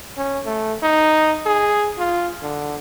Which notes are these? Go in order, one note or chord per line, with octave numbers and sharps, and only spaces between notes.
C#4
A3
D#4
G#4
F4
D3